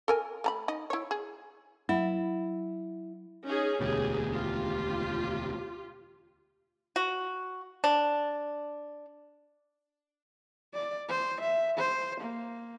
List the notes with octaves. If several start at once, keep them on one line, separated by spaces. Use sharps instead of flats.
A4 A#4 G#5
A3 A#5 B5
D#4 D#5
E4 C#5
G#4
F#3 E4
C#4 D#4 G#4
E1 D2 B2 G4 G#4
F4 G4
F#4
D4
D5
C5
E5
C5
A#3